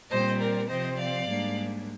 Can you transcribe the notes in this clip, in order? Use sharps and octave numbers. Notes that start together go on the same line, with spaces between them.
A#2 G3 C4 C5 D#5
A#4 D5
C3 F3 C4 C5 D#5
D5 F5
G#2 G3 A#3 D4